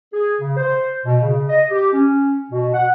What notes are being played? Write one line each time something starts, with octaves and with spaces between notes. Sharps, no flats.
G#4
C#3
C5
B2
C#3
D#5
G4
C#4
B2
F#5